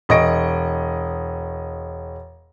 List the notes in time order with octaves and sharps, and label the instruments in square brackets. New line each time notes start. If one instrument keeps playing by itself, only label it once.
[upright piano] E1 D#5 C#6 A#6 D7